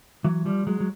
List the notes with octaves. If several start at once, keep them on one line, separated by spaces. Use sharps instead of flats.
E3 F#3
F3 G3
F#3 G#3
F#3